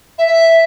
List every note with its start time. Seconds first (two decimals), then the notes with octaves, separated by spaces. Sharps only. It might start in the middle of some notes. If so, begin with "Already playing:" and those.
0.18 E5